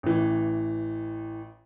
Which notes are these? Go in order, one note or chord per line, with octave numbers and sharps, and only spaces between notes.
A1 E3